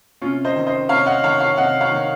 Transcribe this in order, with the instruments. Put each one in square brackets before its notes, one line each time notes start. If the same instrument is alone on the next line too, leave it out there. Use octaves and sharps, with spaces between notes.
[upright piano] C3 C#4 F4
C5 D#5
D#3
C5 D#5
C3 C#5 F5
D#5 F#5
D#3 C#5 F5
C#5 F5
C3 D#5 F#5
C#5 F5
D#3